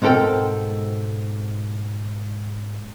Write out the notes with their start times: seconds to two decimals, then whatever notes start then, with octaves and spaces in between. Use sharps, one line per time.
0.02 G#2 B2 C4 A4 A#4 G5